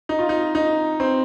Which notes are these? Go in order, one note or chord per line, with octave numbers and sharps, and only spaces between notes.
D#4
F4
D#4
D#4
C4